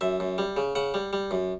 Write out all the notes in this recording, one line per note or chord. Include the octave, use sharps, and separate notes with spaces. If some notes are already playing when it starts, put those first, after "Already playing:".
F#2 E5
F#2
G3
C#3
C#3 F#5
G3
G3
F#2